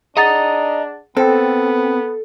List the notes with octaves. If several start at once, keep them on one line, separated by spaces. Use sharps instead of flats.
D4 G#4 D#5 F#5 A#5 A6
B3 C4 A4 C5 G5